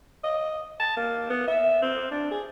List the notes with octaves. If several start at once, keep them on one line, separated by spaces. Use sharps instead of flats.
D#5
A5
A#3
B3
E5
C4
D4
G#4